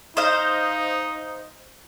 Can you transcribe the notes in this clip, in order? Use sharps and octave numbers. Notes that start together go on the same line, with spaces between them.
D#4 C5 D#5 F5